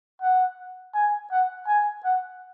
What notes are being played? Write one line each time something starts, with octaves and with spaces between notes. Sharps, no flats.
F#5
G#5
F#5
G#5
F#5